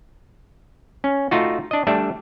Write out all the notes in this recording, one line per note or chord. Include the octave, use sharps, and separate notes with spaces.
C#4
A3 D#4 F4 F#4
D4 D#5
G3 A3 D4 E5